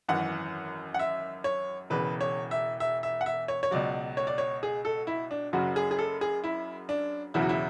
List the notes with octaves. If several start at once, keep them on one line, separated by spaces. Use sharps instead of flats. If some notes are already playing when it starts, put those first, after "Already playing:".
G#1 F#2 E3 F#5
F#5
E5
C#5
E1 E2 C#3 B4
C#5
E5
E5
E5
F#5
E5
C#5
C#5
C#2 B2 F#3 D5
C#5
D5
C#5
G#4
A4
E4
D4
F#1 F#2 C#3 F#3 F#4
G#4
G#4
A4
G#4
E4
D4
E1 E2 C#3 F#3 E4
F#4
E4